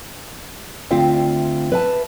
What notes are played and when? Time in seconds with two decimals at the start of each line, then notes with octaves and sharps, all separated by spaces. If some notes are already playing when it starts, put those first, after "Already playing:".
0.91 D2 C4 F4 E5 G5
1.72 B4 E5 A5